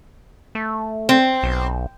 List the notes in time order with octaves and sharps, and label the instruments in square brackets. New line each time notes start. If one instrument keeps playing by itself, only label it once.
[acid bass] A3
[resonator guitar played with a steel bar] C4
[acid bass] B1